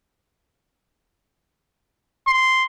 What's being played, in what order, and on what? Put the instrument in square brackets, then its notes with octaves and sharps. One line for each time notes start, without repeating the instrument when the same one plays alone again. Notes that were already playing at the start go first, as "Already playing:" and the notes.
[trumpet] C6